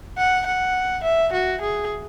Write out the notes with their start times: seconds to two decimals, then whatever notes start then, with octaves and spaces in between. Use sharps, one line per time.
0.18 F#5
0.46 F#5
1.04 E5
1.33 F#4
1.61 G#4